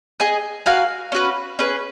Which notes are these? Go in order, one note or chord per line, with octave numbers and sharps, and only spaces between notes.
G#4 D#5 G#5
F#4 A#4 F5 G#5
C#4 F#4 B4
C#4 G#4 B4